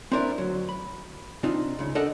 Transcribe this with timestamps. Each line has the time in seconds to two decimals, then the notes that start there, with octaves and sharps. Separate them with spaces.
0.12 C4 D4 E4 A#4 B4 D5
0.38 D2 F#3
0.69 B5
1.43 C3 C4 D4 D#4 F4
1.79 C#2 C#3
1.95 D4 A4 A#4 D5 D#5 F#5